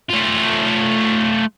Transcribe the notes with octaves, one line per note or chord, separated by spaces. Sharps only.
A3 F4